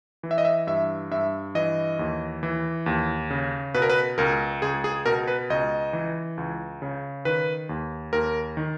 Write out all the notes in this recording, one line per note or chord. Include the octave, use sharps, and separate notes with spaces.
E3
E5
D#5
E5
G2 E5
G2 E5
E3 D#5
D#2
E3
D#2
C#3
B2 B4
A#4
B4
C#2 A#4
C#2 G#4
G#4
B2 A#4
B4
C#2 D#5
E3
C#2
C#3
D#3 B4
D#2
D#2 A#4
D#3